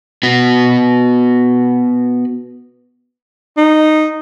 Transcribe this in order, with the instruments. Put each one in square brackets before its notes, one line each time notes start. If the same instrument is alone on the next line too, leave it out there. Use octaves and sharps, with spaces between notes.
[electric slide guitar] B3 F#4
[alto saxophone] D#4